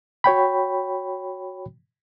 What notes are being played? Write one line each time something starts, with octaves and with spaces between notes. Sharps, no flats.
F#4 C#5 G5 B5